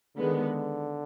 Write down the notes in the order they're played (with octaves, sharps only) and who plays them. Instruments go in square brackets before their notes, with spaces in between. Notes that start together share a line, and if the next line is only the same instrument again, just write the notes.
[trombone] D3 [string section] D#3 G#3 B3